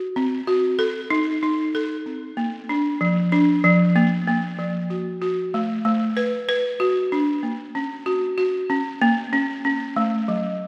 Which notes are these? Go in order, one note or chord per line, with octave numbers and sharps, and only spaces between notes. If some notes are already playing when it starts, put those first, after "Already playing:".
Already playing: F#4
C4
F#4
A4
D#4
D#4
A4
C4
A#3
D4
F3
D4
F3
A#3
A#3
F3
F#4
F#4
A3
A3
B4
B4
F#4
D4
A#3
C#4
F#4
F#4
C#4
A#3
C#4
C#4
A3
F#3